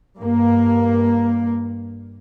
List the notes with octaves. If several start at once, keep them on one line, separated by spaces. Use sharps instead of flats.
G2 A#3